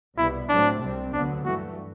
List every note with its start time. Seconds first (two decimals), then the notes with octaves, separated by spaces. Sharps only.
0.16 C2 B2 G3 B3 E4
0.49 A2 F#3 A3 C4 D4
0.81 C2 C3 G3 C4
1.13 D2 D3 F#3 B3 D4
1.45 G2 E3 A3 F#4